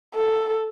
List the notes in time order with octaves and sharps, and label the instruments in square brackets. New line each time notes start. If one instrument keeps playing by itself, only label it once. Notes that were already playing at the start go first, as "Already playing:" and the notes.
[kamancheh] A4